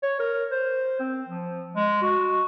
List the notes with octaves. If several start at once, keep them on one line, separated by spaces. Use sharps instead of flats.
C#5
A#4
C5
C4
F3
G#3
F#4